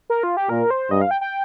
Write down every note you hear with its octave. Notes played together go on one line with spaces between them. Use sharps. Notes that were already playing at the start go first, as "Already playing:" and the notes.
A#4
F4
G4
A#2 A#4
C5
G2 D#5
F5
G5
G5